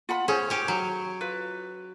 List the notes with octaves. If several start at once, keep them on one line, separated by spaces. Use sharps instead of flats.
F4 F#5 B5
C#4 G#4 C5
C#4 G4
F#3
F4 B4